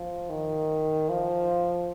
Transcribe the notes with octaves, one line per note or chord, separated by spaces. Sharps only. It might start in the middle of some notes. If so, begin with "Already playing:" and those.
Already playing: F3
D#3
F3